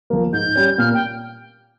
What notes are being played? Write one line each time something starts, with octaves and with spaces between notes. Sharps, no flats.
F3 A#3
G#2 G6
G3 C#4
A#2 F6
G5